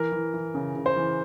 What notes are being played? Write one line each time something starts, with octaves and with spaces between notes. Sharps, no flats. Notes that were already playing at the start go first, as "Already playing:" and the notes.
Already playing: E3 A#4
E3
E3
C#3
C#3
C5
E3